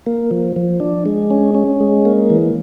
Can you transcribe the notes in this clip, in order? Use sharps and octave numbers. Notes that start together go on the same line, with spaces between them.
A#3
F3
F3
D4
G#3
C#4
C#4
G#3
A#3
E3